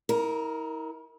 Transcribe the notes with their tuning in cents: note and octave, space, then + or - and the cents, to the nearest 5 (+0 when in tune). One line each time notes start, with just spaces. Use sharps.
E4 -45 A#4 +0